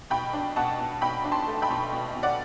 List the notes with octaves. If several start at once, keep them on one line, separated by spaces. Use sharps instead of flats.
B2 G5 B5
D4
B2 F#5 A5
B2
B2 G5 B5
D4
A5 C6
A3
G5 B5
B2
B2
B2
D5 F#5